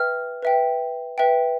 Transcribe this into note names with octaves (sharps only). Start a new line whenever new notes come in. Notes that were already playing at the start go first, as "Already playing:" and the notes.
Already playing: B4 E5 G5 F6
B4 E5 G5
B4 E5 G5